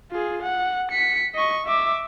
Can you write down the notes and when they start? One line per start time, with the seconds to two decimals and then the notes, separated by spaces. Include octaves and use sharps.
0.11 F4 G#4
0.43 F#5
0.92 B6 C#7
1.35 D#5 C#6
1.67 E5 D6